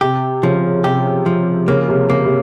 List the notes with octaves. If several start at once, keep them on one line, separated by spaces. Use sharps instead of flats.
C3 G4
C#3 F3
C3 G4
F3
C#3 A#3
C3
C#3 A#3
C3